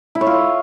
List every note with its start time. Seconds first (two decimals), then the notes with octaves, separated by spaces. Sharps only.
0.15 E4
0.21 C#5
0.27 F4